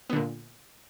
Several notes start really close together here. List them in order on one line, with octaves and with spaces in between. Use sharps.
B3 D3 A#2